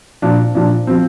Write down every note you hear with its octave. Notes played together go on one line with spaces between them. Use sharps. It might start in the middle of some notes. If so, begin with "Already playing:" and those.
A#2 F3 D4
A#2 F3 D4
F3 C4